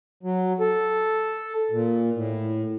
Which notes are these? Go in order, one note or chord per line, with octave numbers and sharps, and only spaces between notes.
F#3
A4
A#2
A2